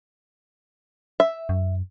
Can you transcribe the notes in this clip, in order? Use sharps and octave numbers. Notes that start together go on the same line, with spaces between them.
E5
F#2